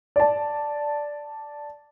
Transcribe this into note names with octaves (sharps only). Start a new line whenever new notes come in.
D5 A5